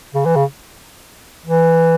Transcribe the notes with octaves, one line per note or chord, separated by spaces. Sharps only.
C#3
E3
C#3
E3